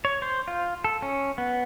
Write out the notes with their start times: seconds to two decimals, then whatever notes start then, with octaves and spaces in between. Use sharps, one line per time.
0.05 C#5
0.22 C5
0.48 F4
0.84 A4
1.02 C#4
1.38 B3